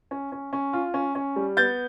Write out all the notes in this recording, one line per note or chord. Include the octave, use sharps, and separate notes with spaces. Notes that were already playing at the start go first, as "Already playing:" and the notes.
C#4
C#4
C#4
F4
C#4
C#4
G3
B3 G6 A6